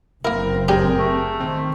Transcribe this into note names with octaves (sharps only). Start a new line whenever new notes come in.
F#1 A#3 C4 E4 A#4
C#4 D4 G4 G#4 A#4 G5
A3
D#3 C4